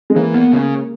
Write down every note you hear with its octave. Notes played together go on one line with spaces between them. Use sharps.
G#3
E3 A#3
B3
C#3